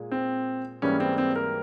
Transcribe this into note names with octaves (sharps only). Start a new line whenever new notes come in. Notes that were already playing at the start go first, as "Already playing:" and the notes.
Already playing: A#2 G#3
C4
G#2 E3 G3 A#3 C#4
C4
C4
A#4